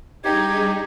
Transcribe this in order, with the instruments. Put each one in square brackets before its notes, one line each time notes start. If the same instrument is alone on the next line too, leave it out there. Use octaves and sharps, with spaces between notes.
[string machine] G3 D4 G#4 [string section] D#4 [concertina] G4 [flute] G#6